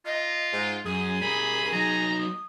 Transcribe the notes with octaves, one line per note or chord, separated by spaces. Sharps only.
F4 D#5
G#2
F#2 G#4 G#5
G3 A#4 B5
F#3 D#4 A#5
D#6